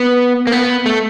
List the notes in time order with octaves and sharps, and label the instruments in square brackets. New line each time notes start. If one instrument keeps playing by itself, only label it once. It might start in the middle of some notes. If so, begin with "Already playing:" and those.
Already playing: [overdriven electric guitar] B3
A#3
B3
A3